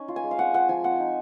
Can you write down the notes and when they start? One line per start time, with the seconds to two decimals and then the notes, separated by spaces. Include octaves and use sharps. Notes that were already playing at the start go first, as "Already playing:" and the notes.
Already playing: C#4 D#4
0.08 F4
0.16 G#5
0.24 G#3
0.31 F5
0.39 C4 F#5
0.54 F4 F#5
0.69 F3 G#5
0.84 C4 F#5
0.99 D#4